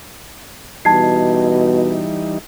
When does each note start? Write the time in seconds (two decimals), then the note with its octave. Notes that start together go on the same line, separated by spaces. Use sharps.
0.85 B2 E3 G3 D#4 A5 G#6 C7